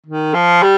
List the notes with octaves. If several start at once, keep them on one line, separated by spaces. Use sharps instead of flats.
D#3
F3
G3